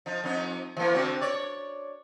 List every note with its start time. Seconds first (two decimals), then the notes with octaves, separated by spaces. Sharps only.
0.06 F3 D#4
0.24 F2 D#4
0.77 E3 A#3
0.94 D3 C4 F#4
1.21 C#5 D5